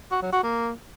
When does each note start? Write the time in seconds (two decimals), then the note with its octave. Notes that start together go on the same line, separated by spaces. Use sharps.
0.12 F#4
0.22 F#3
0.33 F#4
0.43 A#3